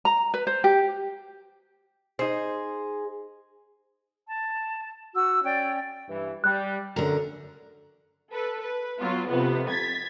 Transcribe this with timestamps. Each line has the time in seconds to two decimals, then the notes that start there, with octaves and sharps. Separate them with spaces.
0.05 A#5
0.34 B4
0.47 C5
0.64 G4
2.19 D#4 G#4 C5
4.27 A5
5.15 F#4 E6
5.44 C#4 D5 G5
6.08 G2 E3
6.44 G3 F#6
6.96 F#2 D3 A#4
8.30 A4 B4
8.62 B4
8.99 F#3 B3 F4
9.29 F2 C3 B3
9.68 G#6 A6 B6